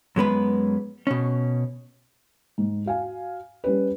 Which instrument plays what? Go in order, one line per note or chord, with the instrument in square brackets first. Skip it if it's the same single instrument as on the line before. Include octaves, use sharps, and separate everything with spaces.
[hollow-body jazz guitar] F#2 G#3 B3 B4
B2 C#4
[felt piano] G#2
F#4 F5 G#5
G3 C#4 B4